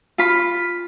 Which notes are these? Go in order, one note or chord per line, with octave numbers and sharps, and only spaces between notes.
F4 B5